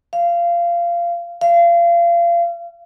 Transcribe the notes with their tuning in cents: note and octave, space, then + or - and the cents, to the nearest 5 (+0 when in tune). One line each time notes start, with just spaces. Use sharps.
F5 -20
F5 -30